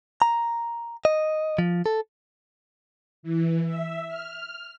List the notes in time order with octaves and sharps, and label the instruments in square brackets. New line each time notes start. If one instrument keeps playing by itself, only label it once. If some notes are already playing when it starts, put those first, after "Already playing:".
[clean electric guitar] A#5
D#5
F3
A4
[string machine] E3
E5
F6